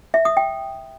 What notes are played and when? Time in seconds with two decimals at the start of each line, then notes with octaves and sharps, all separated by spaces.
0.14 E5
0.25 D#6
0.37 G5